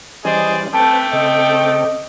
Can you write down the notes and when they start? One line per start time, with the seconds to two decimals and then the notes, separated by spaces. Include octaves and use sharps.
0.25 E3 G3 C#4 G#4 C5 D5 D#5
0.74 A3 C4 B4 G5 A5 D6
1.13 C#3 C4 A4 D#5